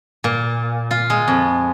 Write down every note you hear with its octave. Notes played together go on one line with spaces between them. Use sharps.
A#2
F4
G#3
F2